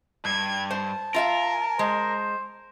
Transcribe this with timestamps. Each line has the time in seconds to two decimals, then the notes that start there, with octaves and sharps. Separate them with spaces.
0.25 G2 G#6
0.71 C5 A5
1.14 F4 A#4 E5 F5
1.79 G#3 C5